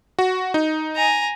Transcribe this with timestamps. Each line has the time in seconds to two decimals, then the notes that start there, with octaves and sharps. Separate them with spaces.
0.19 F#4
0.54 D#4
0.96 G#5 A#5